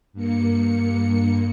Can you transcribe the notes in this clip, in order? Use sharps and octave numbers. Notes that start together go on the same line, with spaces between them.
G2 A#3 C#7